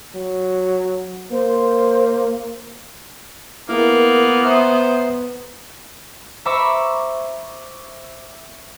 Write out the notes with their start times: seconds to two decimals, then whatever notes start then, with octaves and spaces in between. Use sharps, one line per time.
0.15 F#3
1.32 A#3 C5
3.69 A#3 B3 E4 G#4 A#4
4.45 C5 E5 A#5 D#6
6.45 C5 E5 A#5 B5 C#6 D6